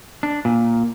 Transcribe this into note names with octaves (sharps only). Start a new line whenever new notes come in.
D4
A#2